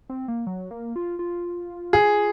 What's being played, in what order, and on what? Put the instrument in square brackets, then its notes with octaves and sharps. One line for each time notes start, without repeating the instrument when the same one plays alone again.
[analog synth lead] C4
A#3
F#3
A#3
F4
F4
[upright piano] G#4